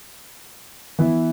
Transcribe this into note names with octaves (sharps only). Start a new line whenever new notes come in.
E3 B3 E4